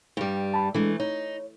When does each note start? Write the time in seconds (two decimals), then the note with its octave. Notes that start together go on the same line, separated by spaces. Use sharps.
0.17 G2 G3
0.54 A5 B5
0.74 E3 G#3 A3 D4 A4
1.00 D#4 C#5